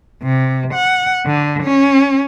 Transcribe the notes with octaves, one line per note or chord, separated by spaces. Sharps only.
C3
F#5
D3
C#4